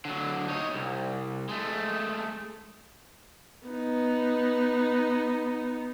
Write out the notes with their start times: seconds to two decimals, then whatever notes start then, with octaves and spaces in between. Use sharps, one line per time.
0.05 D3 F#3
0.48 D#4 C#5
0.74 C2
1.49 G#3 A3
3.67 B3 D#4